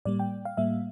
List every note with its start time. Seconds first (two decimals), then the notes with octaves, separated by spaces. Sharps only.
0.05 A2 G3 A#3 D5
0.20 G5
0.45 F5
0.57 A2 G3 A#3 E5